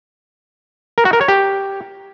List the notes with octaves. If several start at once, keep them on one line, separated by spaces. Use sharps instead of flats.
A#4
F#4
A#4
C#5
G4